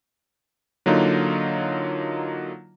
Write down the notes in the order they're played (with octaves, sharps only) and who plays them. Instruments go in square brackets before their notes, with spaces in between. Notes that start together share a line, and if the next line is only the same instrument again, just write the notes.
[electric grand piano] D3 F#3 A#3 D#4 F4